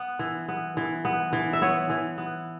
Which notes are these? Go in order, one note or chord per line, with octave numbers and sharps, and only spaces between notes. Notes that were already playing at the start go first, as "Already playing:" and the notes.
Already playing: B3
E3
B3
E3
B3
E3
E5
B3 C#5
E3
B3